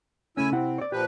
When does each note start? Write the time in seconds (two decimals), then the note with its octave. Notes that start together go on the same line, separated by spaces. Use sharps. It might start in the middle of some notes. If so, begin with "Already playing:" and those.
0.37 C#3 A3 C#4 E4 G#5 E6
0.52 C3 C4 E4 F#5
0.78 C#5 D5
0.92 A#2 F3 G4 B4